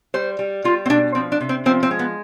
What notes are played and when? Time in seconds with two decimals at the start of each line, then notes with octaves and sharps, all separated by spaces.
0.14 G3 C5
0.39 G3
0.64 G3 F4
0.86 C4
0.90 B2 D4
1.15 F3 C4
1.32 D4
1.41 C3
1.49 C4
1.65 F3 C4
1.83 C4
1.91 G#3
1.99 B3